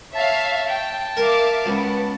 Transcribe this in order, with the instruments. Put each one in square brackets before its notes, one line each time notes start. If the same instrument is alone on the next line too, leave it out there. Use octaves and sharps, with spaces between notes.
[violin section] C#5 E5 F5 [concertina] A5
[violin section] G5
[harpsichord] A#4 [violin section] E5 F5 D6
[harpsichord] C#2 [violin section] B3